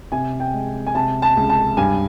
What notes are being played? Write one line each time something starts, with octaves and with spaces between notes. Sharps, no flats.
C3 G#5
G5
G#3
G#5
C3 A5
A5
C#2
A5
G2 G#5